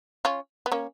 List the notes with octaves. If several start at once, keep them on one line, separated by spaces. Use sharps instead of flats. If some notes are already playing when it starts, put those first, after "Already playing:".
C#4 F4
B3
A#3 C#4